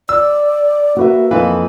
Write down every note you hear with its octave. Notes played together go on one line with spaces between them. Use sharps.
D5 E6
A#3 F#4 B4 E5
F2 E3 D#4 F4 B4